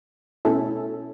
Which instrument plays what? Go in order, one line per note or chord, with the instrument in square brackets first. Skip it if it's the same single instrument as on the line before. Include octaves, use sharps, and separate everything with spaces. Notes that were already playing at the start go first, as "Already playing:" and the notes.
[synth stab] B2 A3 C#4 E4 A4